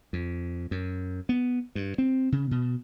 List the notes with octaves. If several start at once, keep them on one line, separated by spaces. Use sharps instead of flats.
F2
F#2
B3
G2
C4
C#3
B2